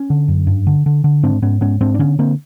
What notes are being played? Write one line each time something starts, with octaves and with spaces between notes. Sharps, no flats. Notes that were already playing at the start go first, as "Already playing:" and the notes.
Already playing: C#4
D3
F#2
G2
D3
D3
D3
G#2 C4 D4
G#2 B3 C#4
G#2 B3 C#4
G#2 C4 D4
D4
D3 B3 C#4
D3 A#3 C4